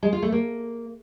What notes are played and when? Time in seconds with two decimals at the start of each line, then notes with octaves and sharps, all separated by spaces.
0.03 G#3
0.13 F4
0.22 A3
0.32 A#3